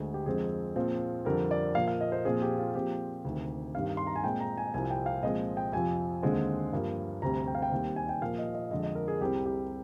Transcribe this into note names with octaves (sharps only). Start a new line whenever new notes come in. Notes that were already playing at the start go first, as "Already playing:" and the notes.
Already playing: D2 D3 G#3
G4
F2 D3 G#3 C4 G#4
A#2 F3 C4
F2 D3 G3 C4 A#4
D5
A#2 F3 A#3 F5
F5
D#5
C5
A#2 F3 C4 G#4
G4
F4
A#2 F3 C4 G4
D2 C3 D#3
G2 D#3 G3 C4 F5
C6
A#5
G#5
A#2 G#3 C4 G5
A#5
G#5
C2 C3 F3 C4 G#5
G5
F5
A#2 F3 G#3 C4 D#5
G5
F2 C3 F3 C4 G#5
D#2 D3 G#3 C4
G2 F3 A#3
D2 C3 G3 C4 A#5
G5
F5
G5
D#2 D#3 G3 C4
G#5
G5
A#2 F3 A#3 F5
D#5
D#5
F2 D3 G#3 D#5
D#5
A#4
G#4
C2 C3 G3 C4 G4
G4